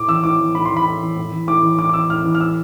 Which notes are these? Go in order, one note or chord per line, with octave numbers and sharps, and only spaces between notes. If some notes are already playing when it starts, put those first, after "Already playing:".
Already playing: A2 D6
E3 E6
A2 D6
E3
A2 B5
E3 C6
B5
A2
E3
A2
E3
A2 D6
E3
A2 D6
D6
E3 E6
A2 F6
E3
F6
A2 E6